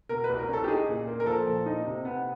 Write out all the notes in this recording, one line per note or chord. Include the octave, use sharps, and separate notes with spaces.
B2 A#4
B4
C2
A#4
C#4 A4
G4
D#4 G#4
A#2
A#3
A#4
F3 A4
A#2
D#4
C3
B3